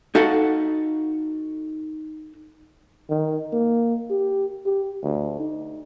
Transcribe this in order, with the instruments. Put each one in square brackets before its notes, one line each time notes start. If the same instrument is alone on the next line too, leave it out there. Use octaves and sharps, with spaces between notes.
[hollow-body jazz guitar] D#4 F#4 A4 F5 F#5
[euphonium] D#3
A#3
G4
G4
D2
D#4